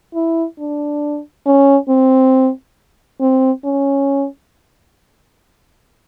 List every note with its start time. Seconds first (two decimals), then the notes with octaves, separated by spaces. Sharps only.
0.14 E4
0.59 D4
1.46 C#4
1.89 C4
3.21 C4
3.64 C#4